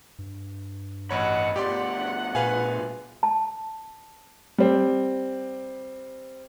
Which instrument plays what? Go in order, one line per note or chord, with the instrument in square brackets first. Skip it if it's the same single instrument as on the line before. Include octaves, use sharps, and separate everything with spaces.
[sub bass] G2
[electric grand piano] A1 C#5 [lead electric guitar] D#5 B5 [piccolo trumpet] F#5
[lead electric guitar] G2 B2 [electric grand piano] G4 D5 C6 [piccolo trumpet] F#5
[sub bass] A#2 [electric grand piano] B4 F5 G#5
[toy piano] A5
[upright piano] G3 C4